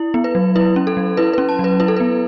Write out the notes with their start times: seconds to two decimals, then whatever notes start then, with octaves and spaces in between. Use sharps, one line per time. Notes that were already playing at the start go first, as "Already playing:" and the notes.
Already playing: E4
0.14 B3
0.24 B4
0.35 F#3
0.56 E4 B4
0.76 C#4
0.87 A4
0.97 F#3
1.17 E4 B4
1.33 B4
1.38 C#4
1.49 A5
1.59 F#3
1.64 B4
1.80 E4 B4
1.88 A4
1.97 B4
2.00 B3